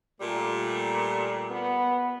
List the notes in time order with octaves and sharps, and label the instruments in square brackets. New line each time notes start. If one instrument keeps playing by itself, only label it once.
[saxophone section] A#2 G3 A3
[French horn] B3